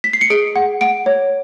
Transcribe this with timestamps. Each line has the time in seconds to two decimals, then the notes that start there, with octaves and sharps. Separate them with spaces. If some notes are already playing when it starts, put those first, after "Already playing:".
0.04 B6
0.13 C7
0.21 C#7
0.30 G#4 D7
0.56 F#5
0.81 F#5 D7
1.06 C#5